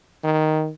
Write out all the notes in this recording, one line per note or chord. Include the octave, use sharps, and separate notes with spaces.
D#3